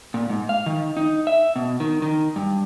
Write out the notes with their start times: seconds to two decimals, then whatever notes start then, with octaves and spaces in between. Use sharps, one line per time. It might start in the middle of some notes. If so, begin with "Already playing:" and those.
0.14 A#2
0.29 G#2
0.49 F5
0.66 D#3
0.97 D#4
1.27 E5
1.56 B2
1.80 D#3
2.02 D#3
2.36 G2